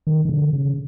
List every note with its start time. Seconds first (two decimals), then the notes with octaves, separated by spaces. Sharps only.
0.07 D#3
0.25 D#3
0.29 D3
0.53 C#3